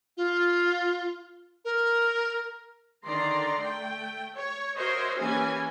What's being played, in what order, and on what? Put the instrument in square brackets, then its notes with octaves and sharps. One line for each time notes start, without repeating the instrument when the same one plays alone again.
[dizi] F4
A#4
[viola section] D3 D#3 D5 A#5 C6
A3 G5
C#5
F#4 A#4 C5 C#5 D#5 E5
E3 A#3 C#4 G4 G#5